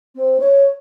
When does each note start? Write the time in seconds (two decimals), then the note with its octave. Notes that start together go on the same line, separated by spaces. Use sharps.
0.15 C4
0.40 C#5